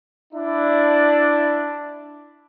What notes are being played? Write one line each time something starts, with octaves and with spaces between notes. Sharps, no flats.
D4 E4